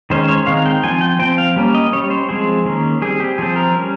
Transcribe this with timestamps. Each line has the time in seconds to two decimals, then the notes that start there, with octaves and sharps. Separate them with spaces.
0.10 D#3 G#3 C#4 C5
0.28 C#5
0.47 D#3 G#3 C4 F5
0.66 G5
0.84 F3 C4 G#5
1.01 G5
1.19 F3 C4 G5
1.38 F5
1.56 G3 A#3 C#4
1.75 D#5
1.92 G3 C#4 C#5
2.10 C5
2.29 F3 G#3 C4 G#4
2.65 D#3 A#3 C#4
3.02 G3 C4 G#4
3.20 G4
3.38 F3 C4 G#4
3.56 A#4
3.74 G3 C#4